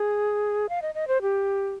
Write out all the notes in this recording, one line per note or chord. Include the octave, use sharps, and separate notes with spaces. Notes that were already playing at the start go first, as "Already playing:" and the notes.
Already playing: G#4
F5
D#5
D#5
C5
G4